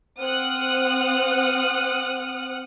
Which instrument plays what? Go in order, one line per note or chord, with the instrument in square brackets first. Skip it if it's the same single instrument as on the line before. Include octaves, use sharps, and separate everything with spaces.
[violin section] C4 F#5 D#6 F6 F#6